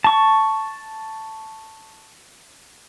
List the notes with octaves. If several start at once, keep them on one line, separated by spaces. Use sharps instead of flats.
A5 C#6